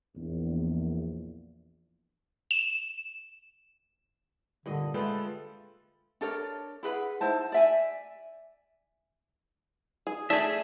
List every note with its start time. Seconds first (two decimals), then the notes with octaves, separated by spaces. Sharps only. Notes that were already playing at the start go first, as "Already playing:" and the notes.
0.16 A#1 E2
2.51 E7
4.66 G2 A#2 D3 D#5
4.94 G#3 A3 F4 A4 B4 G5
6.21 D4 A4 A#4 C#5
6.83 E4 G#4 B4 F#5
7.21 D#4 E4 C5 A5
7.52 D5 E5 G#5
10.07 G#4
10.30 A3 G#4 D5 E5 A5